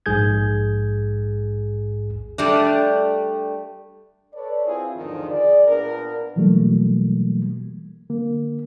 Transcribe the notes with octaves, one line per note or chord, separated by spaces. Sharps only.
A#1 G#2 G#4 G6 G#6
G3 A3 D4
A4 B4 C#5 D5
C4 E4 F4 G#4
E2 G#2 D3 D#3 F3
G#4 D5
A#2 B3 D4 A#4
B2 E3 F#3 G3 A3 A#3
D3 A#3